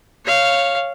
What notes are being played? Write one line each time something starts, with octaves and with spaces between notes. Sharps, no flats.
C#5 F5